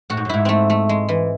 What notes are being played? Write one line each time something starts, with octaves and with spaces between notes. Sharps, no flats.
A2 F#4
G#2
F#2
G#2 E4
A3 C4
A3
G#3
E3